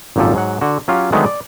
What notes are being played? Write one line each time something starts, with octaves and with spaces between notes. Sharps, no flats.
G#1 F#2 A#2 F3 G4 A4
G#2 F#3 F#5
D3 F#4
F#3 C#4 F4 G4
D3 D#3 F#3 G#3 A3 B3
D5